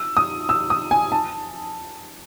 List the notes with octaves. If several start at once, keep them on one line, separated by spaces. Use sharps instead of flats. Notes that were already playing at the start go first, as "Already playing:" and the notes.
Already playing: E6
D#6
E6
D#6
G#5
A5